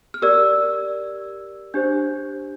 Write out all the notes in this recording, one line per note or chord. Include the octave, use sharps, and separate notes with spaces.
F6
G4 A#4 D5 E6
D4 G4 C5 G6